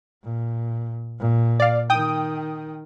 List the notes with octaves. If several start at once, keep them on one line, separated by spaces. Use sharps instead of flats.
A#2
A#2
D5 F5
D#3 G5 D#6